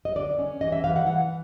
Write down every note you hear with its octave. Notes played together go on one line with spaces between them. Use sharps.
D#5
D3 D5
C#4
E3 D#5
E5
E3 F5
F#5
E3 F#5